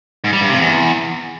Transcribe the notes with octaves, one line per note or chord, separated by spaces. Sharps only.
G#2
G3
G2
C3
E2